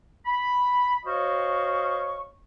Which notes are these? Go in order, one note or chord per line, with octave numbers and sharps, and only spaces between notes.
B5
F#4 C5 C#5 D#5 F5 C#6